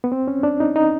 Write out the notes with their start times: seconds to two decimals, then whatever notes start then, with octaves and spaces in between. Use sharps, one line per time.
0.04 B3
0.12 C4
0.28 C#4
0.43 D4
0.60 D#4
0.76 D#4